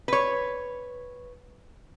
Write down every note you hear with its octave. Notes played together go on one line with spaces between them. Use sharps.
B4 C#5